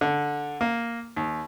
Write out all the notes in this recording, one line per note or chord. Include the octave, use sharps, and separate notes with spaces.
D3
A#3
D#2